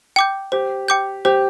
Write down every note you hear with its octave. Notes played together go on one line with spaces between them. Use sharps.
G5 D6 G6
G4 C5
G5 D6 G6
G4 C5